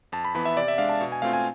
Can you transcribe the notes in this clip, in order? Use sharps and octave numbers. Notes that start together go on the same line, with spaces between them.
F2 A5
B5
E3 B3 B5
E5
C3 D5
E5
G#3 D4 F5
A5
B2
G#5
A3 C4 F4 F5
G#5